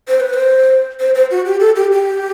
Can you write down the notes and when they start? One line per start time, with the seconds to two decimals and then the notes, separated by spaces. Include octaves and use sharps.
0.08 C5
0.20 B4
0.33 C5
1.00 C5
1.15 C5
1.31 F#4
1.46 G4
1.60 A4
1.76 G4
1.92 G4